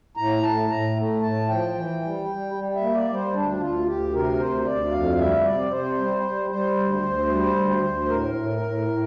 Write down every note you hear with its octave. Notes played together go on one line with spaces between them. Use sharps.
A2 A#5
A2 A5
A2 A#5
A3
A2 A5
F3 G5
E3
G3
G3
G3
E5
A#3
D5
G3
C5
D2 D4
D2 F4
D2 G4
C3 A#4
D2 C5
D2 D5
F2 F5
G3 E5
C3 D5
C3 C5
G3
G3
G3 C5
D2
D2
G3
D2
D2
A2 A#4
A2
A2
A2